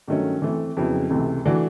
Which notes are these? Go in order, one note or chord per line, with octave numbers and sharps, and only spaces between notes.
G2 D#3 F#3 A3 C#4
E3 A3 C4
F2 C#3 F#3 B3 E4
C#2 C3 E3 A3
E3 A3 D4 F#4